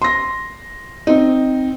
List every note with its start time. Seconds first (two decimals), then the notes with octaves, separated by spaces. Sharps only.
0.02 C6 A#6
1.07 C4 D#4